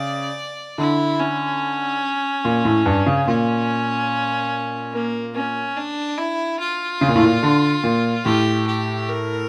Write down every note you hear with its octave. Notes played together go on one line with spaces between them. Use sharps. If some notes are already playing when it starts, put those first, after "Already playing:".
Already playing: C#3 D5
D3 E4
C#4
A#2
A2
G2
C#3
A#2 C#4
A#3
C#4
D4
E4
F4
C#3
A#2
A2
A#2
D3
A#2
A2 G4
G4
A#4